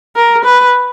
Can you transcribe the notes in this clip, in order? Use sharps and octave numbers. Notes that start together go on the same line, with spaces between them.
A#4
B4